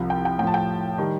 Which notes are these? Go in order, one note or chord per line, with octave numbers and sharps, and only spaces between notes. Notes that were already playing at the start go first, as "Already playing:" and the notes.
Already playing: C2 C3 F3
G5
G5
A2 F3 G5 A5
G5
D#3 G3